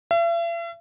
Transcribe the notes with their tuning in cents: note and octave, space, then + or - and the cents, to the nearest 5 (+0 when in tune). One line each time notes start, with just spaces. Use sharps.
E5 +45